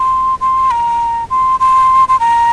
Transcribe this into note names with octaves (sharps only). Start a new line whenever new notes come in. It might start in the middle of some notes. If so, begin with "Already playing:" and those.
Already playing: C6
C6
A#5
C6
C6
C6
A#5